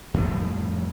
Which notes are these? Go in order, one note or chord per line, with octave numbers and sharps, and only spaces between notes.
F2 A2 F3 G3